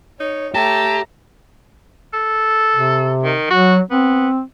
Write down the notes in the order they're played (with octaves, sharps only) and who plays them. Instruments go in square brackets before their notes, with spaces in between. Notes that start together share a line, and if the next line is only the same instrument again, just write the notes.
[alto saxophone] D#4 [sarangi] C#5
[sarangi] A3 [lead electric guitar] G4 [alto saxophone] A5 [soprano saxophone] A#5
[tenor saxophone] A4
[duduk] C3
[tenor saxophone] D#3
[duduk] F#3 [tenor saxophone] F#4
[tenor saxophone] B3 [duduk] C4